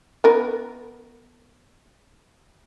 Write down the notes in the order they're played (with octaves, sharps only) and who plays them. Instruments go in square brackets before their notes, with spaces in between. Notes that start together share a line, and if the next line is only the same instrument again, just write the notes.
[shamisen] B3 A#4 B4